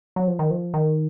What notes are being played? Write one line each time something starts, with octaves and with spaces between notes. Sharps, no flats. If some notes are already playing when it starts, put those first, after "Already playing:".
F#3
F3
D#3
F3
D#3